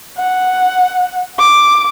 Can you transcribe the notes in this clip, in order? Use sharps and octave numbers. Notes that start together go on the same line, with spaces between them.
F#5
D6